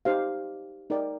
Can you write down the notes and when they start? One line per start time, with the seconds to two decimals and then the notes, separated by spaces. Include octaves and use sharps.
0.05 D#4 G4 C5 F5
0.90 D#4 A#4 D5 G5